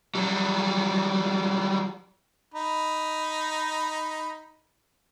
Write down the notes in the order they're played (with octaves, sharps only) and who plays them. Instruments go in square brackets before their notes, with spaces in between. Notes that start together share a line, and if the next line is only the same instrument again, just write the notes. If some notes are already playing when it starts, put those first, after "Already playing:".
[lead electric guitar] F#3 G3
[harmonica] D#4 B5